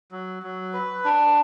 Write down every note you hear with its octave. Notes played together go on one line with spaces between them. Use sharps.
F#3
F#3
B4
D4